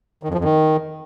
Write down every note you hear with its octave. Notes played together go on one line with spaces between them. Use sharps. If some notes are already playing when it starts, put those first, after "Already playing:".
D#3
F2
F3
F2
D#3